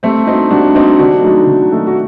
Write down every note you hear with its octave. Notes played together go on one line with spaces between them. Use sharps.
G3 A3 C4
C4 D4 D#4 F#4
G3 D4 F#4
C4 D4 D#4 F#4
D#3 D4 F#4
F#3 A3 D#4
D#3
F#3 A3 D#4
F#4